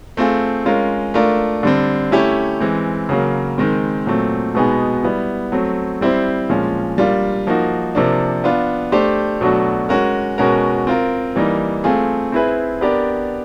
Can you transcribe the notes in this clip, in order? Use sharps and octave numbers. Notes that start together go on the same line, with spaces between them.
A3 C4 F4 G#4
G#3 C#4 F4 A#4
A3 D4 F4 A#4
D3 G3 C4
A3 C#4 E4 G4
E3 G#3 C4
C#3 F#3 A#3
D#3 G#3 C4
A#2 F#3 A3 C4
B2 G#3 B3 D#4 G#4
G3 B3 E4
F#3 A3 C4
G3 C4 E4 G4 C5
A#2 F3 G#3 C#4 F4
G3 A#3 D4 F4
F3 A#3 D#4 F#4
C3 F3 A#3 D4
B3 D4 F4
A3 D4 G4 C5
B2 F#3 A3 D4 F#4
G#3 C#4 F#4 A#4
B2 G#3 C#4 F#4 A#4
C4 F4 A#4
E3 G3 A#3 D#4
A3 C4 F4 G#4
C4 E4 G#4 B4 E5
B3 D4 G4 A#4 D5